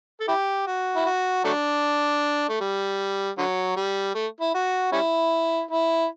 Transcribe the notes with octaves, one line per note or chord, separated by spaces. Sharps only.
A4
E4 G4
F#4
E4
F#4
F#3 A3 D4
A3
G3
D3 F#3
G3
A3
E4
F#4
G3 C#4 E4
E4